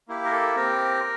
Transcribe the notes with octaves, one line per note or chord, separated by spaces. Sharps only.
A#3 E4 G4
A#4
A4
C4 G4 A#4